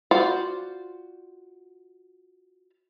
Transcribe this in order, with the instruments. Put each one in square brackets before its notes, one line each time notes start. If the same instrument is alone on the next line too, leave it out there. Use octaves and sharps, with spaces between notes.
[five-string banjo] F4 F#4 C5 D5